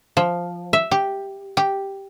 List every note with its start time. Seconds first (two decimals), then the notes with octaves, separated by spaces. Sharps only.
0.17 F3
0.73 E5
0.91 G4
1.57 G4